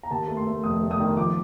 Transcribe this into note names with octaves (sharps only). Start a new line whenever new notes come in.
A#5
D#2 A5
A3
C6
A3
F1 D#6
A3
D#6
D#3
F3 D6